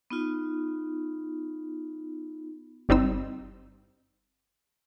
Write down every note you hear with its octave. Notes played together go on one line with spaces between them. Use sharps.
B3 D#4 F4
G1 G3 C4 D#4 E6